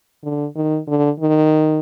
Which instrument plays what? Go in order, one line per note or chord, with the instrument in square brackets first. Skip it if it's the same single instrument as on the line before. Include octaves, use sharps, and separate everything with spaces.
[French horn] D3
D#3
D3
D#3